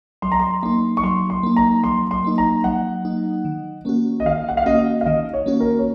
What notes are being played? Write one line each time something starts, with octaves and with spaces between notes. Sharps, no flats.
F#3 C6
A#5
C6
A#3 D#4 C6
C#6
F#3 C6
C6
A#3 D#4
A#5
F#3 C6
C6
A#3 D#4
A#5
F#3 F#5
A#3 D#4
D#3
A#3 C#4 F#4
D#5
D#3 F5
F#5
F5
A#3 C#4 F#4 D#5
F5
D#3 D#5
C#5
A#3 C#4 F#4
A#4
C#5